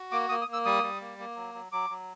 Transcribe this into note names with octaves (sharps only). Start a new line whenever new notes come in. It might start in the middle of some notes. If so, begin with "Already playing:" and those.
Already playing: F#4
A#3 D6
A#3 D#6
D#6
A#3
E6
G3 D#6
G3
A#3
A#3
F#3
F#3
F#3 D6
F#3